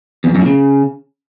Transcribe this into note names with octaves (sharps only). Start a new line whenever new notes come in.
E2
F2
F#2
A2
C#3